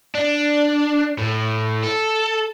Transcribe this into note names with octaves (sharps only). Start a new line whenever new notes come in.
D4
A2
A4